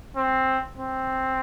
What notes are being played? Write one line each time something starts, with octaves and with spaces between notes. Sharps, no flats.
C4
C4